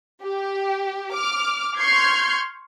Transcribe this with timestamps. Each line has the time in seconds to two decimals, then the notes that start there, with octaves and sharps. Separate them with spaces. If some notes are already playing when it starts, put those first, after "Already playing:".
0.23 G4
1.13 D6 F6
1.77 C6 C#6 F6 G6 G#6 C7